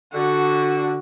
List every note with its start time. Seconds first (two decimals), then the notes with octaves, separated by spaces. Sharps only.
0.13 D3 F#4